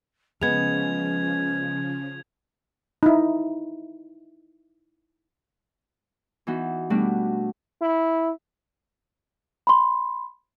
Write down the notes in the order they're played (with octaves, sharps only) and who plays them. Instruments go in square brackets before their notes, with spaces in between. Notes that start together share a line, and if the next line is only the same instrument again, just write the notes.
[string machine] C#3 F3 [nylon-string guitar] G#3 B3 [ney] C#4 [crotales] G#6 F7
[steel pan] D#4 E4
[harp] E3 B3 D#4 F#4
B2 G3 A3 D4 F#4
[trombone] E4
[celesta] B5 C6